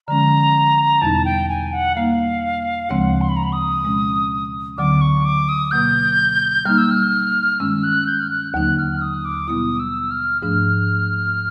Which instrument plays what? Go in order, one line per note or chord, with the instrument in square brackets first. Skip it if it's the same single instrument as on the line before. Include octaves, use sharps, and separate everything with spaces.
[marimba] D3 F3 G#3 C#4 [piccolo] A#5
[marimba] E2 B2 G3 B3 D#4 [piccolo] A5
[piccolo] G5
G#5
F#5
[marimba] G3 A#3 D#4 [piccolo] F5
[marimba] D2 C#3 F3 G#3 C4 [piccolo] F#5
[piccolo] C6
B5
A#5
B5
D#6
[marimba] B2 G#3 C#4
[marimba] D2 D3 F#3 B3 [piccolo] D6
[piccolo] C#6
D6
D#6
[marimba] B2 F#3 A#3 [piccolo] G6
[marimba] G3 A#3 D#4 [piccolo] F6
[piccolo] E6
F6
[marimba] G2 D#3 G#3 C#4 [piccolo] E6
[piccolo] F#6
G6
F6
F#6
[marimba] D#2 D3 F#3 A#3 D#4 [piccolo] F#6
[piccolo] F6
D#6
D6
[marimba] B2 G3 B3 E4 [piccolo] D#6
[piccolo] E6
F6
[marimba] G#2 F3 A3 D4 [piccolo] F6